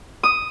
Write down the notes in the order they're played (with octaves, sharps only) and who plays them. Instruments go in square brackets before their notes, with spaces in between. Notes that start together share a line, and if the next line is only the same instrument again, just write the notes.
[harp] D#6